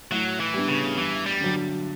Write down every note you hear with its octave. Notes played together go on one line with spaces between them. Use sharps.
A2 F#3
E3
G3 B3 D4
C#3
G2 E3
G3
D3 F#3